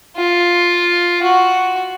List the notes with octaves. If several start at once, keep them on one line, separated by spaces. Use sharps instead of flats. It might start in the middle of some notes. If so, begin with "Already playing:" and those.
F4
F#4